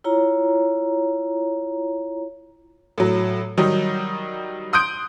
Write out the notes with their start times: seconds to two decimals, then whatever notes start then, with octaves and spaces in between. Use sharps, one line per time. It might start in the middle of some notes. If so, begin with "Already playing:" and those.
0.04 E4 F4 C#5 A#5
2.98 A2 F#3
3.57 D#3 F#3 G3 D#4
4.73 C6 D#6 F#6 G6 D7